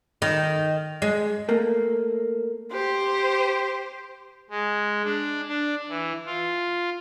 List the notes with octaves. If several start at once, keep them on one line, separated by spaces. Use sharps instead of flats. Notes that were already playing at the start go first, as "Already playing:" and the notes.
D#3
G#3
A3 A#3
G4 C5
G#3
D4
D4
E3
F4